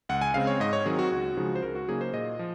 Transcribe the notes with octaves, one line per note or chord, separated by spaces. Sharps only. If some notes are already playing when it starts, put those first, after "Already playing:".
C#2 F#5
G#5
C#3 G#3 C4 F5
C#5
G#2 D#5
C#5
D#3 F#3 C4 G#4
F#4
C#2 F#4
C#3 F3 G#3 D#4
C5
C#2 A#4
F#4
C#3 F#3 A#3 D#4 G#4
C5
A#2 D#5
F3